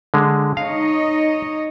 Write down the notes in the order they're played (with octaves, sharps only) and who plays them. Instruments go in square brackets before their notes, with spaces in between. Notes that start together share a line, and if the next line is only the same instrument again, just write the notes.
[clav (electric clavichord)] D3 G#3
[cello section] D#4 C#5 D#5 [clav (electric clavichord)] F5